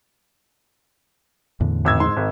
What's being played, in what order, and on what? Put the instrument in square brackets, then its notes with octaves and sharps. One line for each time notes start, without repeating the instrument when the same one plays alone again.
[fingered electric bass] E2 A2 D3
[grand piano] G#1 E6 G#6
G#2 C6
G#1